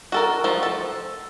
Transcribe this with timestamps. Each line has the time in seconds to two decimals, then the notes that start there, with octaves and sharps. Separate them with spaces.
0.12 F#4 A4 A#4
0.44 F3 A3
0.63 A4